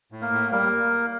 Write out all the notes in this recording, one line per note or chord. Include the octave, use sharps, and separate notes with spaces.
A2
A#3 A#4
A2
G3 A#3 A#4